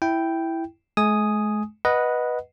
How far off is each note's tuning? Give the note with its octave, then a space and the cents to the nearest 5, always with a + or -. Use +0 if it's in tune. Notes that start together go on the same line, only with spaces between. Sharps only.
E4 +0 G5 -5
G#3 +40 G#5 +5 D#6 +0
B4 -10 D#5 +0 F#5 +0